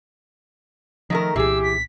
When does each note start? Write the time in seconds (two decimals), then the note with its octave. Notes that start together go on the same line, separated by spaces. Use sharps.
1.10 D#3 F3 A3 A#4
1.36 C2 A#2 E3 G4 G#4 E6
1.63 B6